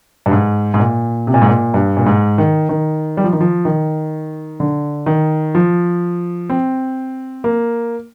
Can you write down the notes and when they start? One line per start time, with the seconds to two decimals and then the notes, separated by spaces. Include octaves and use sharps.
0.26 G2
0.31 G#2
0.74 G#2
0.80 A#2
1.27 C3
1.34 A#2
1.42 G#2
1.49 A#2
1.74 G2
1.97 A#2
2.06 G#2
2.38 D#3
2.69 D#3
3.17 G3
3.24 F3
3.33 D#3
3.40 F3
3.65 D#3
4.60 D3
5.06 D#3
5.55 F3
6.50 C4
7.44 A#3